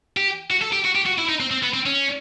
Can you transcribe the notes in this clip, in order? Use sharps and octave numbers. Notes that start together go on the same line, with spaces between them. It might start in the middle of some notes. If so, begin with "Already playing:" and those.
G4
F#4
A4
G4
F#4
G4
F#4
E4
D#4
C4
C4
B3
C4
C#4